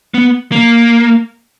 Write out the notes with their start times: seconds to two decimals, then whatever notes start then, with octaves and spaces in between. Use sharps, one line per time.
0.14 B3
0.52 A#3